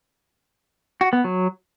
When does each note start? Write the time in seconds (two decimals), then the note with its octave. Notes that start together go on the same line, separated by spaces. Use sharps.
1.01 F#4
1.13 B3
1.24 F#3